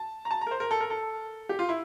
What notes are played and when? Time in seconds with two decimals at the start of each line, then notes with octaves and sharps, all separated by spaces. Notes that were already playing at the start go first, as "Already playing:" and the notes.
Already playing: A5
0.25 A#5
0.31 A5
0.41 A#5
0.47 A#4
0.51 C5
0.60 A#4
0.71 A4
0.81 A#4
0.90 A4
1.49 G4
1.59 F4
1.69 E4